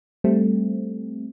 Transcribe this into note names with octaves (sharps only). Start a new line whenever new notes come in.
G3 A3 C4